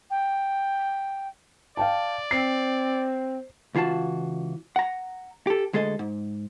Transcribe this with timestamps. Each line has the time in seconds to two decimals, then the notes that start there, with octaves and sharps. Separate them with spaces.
0.10 G5
1.77 D5 F5 G5 A5
2.31 C4 C5 C7
3.75 C#2 E3 F4 F#4 A5
4.76 F#5 A#5
5.47 G4 A4
5.73 D2 G#3 G#4 A4 D#5
5.99 G#2